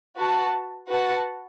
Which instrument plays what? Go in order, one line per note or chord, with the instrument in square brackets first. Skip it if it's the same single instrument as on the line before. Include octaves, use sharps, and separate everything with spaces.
[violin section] F#4 B4 A5
F#4 B4 F#5 A5